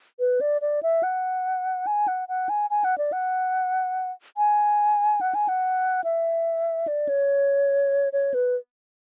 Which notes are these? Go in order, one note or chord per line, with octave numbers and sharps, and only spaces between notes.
B4
D5
D5
E5
F#5
G#5
F#5
F#5
G#5
G#5
F#5
D5
F#5
G#5
F#5
G#5
F#5
E5
D5
C#5
C#5
B4